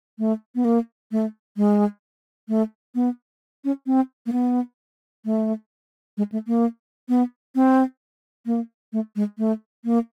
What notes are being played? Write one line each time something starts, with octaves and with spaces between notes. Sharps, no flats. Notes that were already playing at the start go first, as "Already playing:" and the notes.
A3
B3
A#3
A3
G#3
A3
B3
C#4
C4
A#3
B3
A3
G#3
A3
A#3
B3
C4
A#3
A3
G#3
A3
A#3